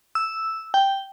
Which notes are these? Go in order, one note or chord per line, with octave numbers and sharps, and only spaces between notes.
E6
G5